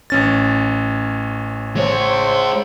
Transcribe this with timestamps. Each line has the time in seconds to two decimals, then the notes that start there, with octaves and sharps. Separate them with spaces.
0.10 A1 C#4 A6
1.76 G#3 C5 C#5